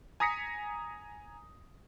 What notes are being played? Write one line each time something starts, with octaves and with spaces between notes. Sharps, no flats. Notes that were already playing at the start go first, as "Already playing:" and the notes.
G#5 A#5 D#6 A#6 B6 C#7